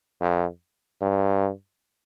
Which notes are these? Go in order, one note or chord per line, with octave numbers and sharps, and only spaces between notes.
F2
G2